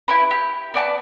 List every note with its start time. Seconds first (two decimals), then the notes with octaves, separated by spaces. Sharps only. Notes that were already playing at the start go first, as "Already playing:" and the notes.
0.08 E4 G4 B4
0.31 G4
0.74 B3 D5 G5 A5